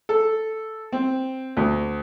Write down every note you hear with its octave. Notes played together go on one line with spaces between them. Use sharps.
A4
C4
D2